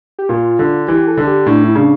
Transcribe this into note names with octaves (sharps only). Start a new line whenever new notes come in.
G4
A#2 F4
D3
E3 G4
A4
D3
G4
A2 D4
E4
C#3 D4